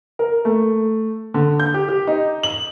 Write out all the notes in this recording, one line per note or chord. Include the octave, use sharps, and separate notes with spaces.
A#4
A3
D3
G6
G4
G4
D#4
F#7